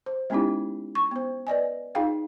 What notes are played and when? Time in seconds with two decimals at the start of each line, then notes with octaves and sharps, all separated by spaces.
0.06 C5
0.30 G#3 B3 C#4 D#4 E4 G4
0.95 C#6
1.11 B3 C5
1.47 B4 D5 D#5 G#5
1.95 D#4 F4 G#4 F5 G5